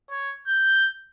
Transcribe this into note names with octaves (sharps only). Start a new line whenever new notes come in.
C#5
G6